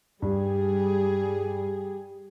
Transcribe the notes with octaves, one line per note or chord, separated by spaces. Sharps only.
G2 G3 G4 G#4